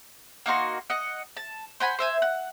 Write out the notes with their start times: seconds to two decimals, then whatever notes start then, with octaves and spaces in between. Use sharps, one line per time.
0.46 A#3 D#4 F#4 C6
0.90 D#5 F#5
1.37 A5
1.80 C5 F#5 G#5 B5
1.99 C5 E5 G#5
2.22 F#5